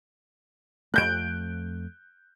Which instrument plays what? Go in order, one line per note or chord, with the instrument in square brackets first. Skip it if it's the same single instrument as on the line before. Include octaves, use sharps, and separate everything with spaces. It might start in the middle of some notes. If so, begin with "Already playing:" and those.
[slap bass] F2 A3 [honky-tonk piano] F#6 G6 D7